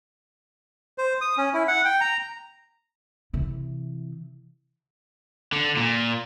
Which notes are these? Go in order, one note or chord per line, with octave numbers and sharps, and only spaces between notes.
C5
D#6
C#4
E4
F#5
G5
A#5
C3 E3
D3
A#2